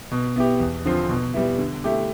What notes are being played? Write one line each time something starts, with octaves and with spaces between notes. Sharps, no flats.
B2
B3 E4 G4
E2
D3 F3 C4 F4
B2
G3 B3 E4
D3
A3 E4 G4